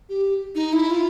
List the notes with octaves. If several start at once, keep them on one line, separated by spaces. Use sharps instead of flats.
G4
D#4
E4
F4